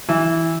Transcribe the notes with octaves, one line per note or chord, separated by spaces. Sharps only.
E3